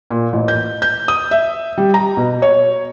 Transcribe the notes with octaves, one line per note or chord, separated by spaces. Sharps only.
A#2
A1
G6
G6
D#6
E5
G3
A#5
B2
C#5